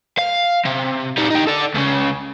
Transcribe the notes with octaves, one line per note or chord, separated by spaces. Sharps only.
F5
C3
G3 D#4
D#4 G4
A4 D5
C#2 C#3